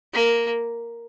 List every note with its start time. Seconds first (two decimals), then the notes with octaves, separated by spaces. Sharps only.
0.14 A#3